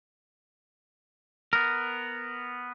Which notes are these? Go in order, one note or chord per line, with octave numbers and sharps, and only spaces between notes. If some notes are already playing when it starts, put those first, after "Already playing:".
B3 A#4